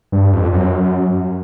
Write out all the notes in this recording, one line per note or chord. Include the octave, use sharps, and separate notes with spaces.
G2
F2
F#2